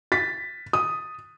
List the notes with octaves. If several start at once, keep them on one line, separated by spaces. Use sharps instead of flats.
A6 B6
D#6